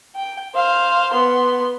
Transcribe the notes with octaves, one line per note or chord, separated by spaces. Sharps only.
G5
C5 F5
B3 C6